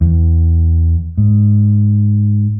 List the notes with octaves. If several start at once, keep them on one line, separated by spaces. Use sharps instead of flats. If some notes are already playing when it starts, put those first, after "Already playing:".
E2
G#2